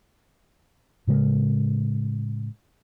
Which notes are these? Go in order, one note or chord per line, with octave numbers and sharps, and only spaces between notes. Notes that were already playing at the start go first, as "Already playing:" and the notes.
A2 C#3 G#3